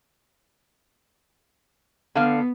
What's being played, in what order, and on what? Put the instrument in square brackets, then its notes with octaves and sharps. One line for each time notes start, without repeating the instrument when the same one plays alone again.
[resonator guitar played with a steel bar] D3 F5 [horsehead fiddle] B3